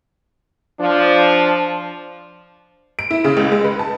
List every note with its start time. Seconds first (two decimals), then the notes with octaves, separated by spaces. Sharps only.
0.80 F3 D4
2.99 D7
3.11 E4
3.24 C#3
3.37 C#2
3.52 G#3
3.64 B4
3.79 A5